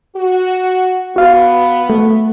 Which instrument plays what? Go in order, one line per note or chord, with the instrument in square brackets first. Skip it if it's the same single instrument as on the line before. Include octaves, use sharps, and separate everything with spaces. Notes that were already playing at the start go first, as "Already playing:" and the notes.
[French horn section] F#4
[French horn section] B3 [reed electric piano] F#4 F5
[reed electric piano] A3